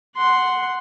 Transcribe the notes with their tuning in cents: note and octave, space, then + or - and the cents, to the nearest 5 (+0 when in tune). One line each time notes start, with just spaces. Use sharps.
F#5 +0 C6 +0